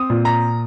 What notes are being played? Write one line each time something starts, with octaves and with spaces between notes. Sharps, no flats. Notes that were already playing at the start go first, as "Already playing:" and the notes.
Already playing: C4 D#6
A#2
A#5